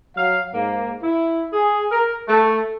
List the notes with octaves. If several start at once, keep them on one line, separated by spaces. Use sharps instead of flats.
F#3 F5
G#2 A#3
E4
G#4
A#4
A3